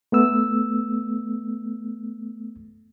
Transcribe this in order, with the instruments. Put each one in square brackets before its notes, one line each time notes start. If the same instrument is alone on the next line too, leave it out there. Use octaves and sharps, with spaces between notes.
[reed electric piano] A3 B3 E6